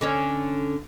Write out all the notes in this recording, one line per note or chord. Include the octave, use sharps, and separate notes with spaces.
D3 C#4 C#5